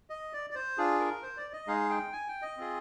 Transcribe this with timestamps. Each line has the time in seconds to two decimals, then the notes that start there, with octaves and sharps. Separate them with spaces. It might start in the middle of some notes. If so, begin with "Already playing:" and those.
0.10 D#5
0.33 D5
0.50 D5
0.55 C5
0.78 D4 F4 G#4
1.00 A#4
1.23 C5
1.37 D5
1.53 D#5
1.67 G#3 D#4 G#4 F5
1.90 G5
2.13 G#5
2.28 G5
2.42 D#5
2.57 C4 F4 G#4